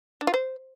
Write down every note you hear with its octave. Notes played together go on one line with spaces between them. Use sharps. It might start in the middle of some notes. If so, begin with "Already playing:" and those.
D4
F4
C5